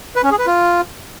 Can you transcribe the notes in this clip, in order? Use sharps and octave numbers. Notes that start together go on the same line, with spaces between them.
B4
C#4
G#4
B4
F4